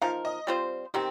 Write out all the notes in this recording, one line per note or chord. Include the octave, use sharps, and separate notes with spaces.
F3 D#4 A#4 F5
D#5
G3 C4 F4 C5
C3 D#3 C4 G4